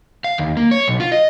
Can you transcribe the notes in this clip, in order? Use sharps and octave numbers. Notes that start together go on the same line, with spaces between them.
F5
D#2
A#3
C#5
B1
F4
D#5